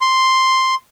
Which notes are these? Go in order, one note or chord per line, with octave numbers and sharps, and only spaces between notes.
C6